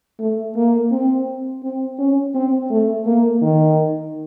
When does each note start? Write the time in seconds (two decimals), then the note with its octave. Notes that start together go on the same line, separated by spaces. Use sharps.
0.20 A3
0.56 A#3
0.92 C4
1.63 C4
1.99 C#4
2.35 C4
2.71 A3
3.06 A#3
3.42 D#3